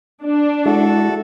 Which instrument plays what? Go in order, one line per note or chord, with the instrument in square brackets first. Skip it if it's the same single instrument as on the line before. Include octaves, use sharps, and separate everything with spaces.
[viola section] D4
[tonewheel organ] G#3 E4 [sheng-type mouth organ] F#4 A4